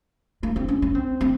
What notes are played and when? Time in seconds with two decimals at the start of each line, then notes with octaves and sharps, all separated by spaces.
0.43 A#3
0.56 C4
0.68 C#4
0.82 C#4
0.95 C4
1.21 C4